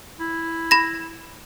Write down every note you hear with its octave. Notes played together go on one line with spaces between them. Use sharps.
E4
B5 A#6